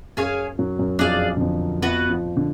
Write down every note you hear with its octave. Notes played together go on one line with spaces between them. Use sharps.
F#2 G#4 C#5 F5 G#5
F#2 F#3
F#2 F#3
F2 F3 D4 G#4 D5 F5
D3
F2 F3
F2 F3 B3 F#4 B4
F2 F3
D3